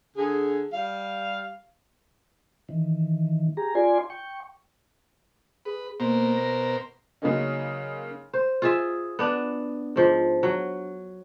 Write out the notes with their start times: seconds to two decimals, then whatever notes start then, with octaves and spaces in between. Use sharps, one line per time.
0.16 D3 G#4
0.72 G3 F5
2.69 D#3 E3
3.57 G4 G#4 A#5
3.75 F4 D5 G#5 C6
4.10 G5 C#6
5.65 G#4 B4
6.00 B2 A#3 A#4 C5
6.37 A#6
7.22 C#3 F#3 G#3 A#3 C#4 D#4
8.33 C5
8.62 F4 G#4 E5
9.19 B3 D4
9.96 G#2 F3
10.43 F#3